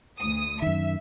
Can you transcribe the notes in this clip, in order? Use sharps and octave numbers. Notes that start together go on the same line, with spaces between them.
D2 D#6
F#2 D#3 E5